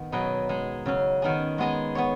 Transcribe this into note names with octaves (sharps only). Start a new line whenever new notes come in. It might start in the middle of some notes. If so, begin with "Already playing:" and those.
Already playing: D#3 B3
B2 F#3 D#4 G#4 B4
G#3 D#4 G#4
C#3 F#3 C#4
D#3 B3 D#4 G#4
G#3 B3 G#4 D#5
B3 G#4 C#5